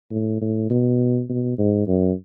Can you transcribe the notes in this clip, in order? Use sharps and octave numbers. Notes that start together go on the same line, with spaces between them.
A2
A2
B2
B2
G#2
F#2